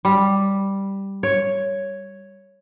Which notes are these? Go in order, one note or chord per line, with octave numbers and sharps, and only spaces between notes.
G3
C#5